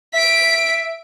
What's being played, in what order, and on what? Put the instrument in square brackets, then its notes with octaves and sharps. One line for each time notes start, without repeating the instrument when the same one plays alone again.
[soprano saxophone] E5 [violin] B6 D7